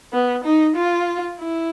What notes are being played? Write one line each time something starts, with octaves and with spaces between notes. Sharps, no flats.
B3
D#4
F4
E4